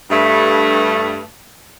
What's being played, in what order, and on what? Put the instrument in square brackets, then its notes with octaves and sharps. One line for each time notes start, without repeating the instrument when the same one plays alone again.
[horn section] G2 A3